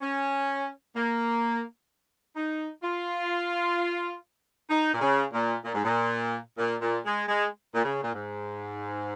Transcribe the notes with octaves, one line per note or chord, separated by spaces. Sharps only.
C#4
A#3
D#4
F4
D#4
A#2
C#3
A#2
A#2
G#2
A#2
A#2
A#2
G#3
G#3
A#2
C#3
A#2
G#2